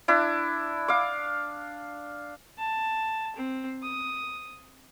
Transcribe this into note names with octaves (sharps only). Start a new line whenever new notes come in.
D4 E4
F5 D6
A5
C4
D#6